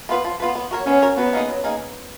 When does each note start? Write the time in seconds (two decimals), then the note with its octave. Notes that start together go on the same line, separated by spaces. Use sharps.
0.09 B3 F4 B4
0.24 F3
0.40 B3 F4 B4
0.55 B3
0.71 F#4 A#4 C#5
0.86 B3 C#4
1.02 F#4 A#4 C#5
1.17 F#3 B3
1.33 A#3 D#4 G#4 D#5
1.49 F#3
1.64 A#3 D#4 G#4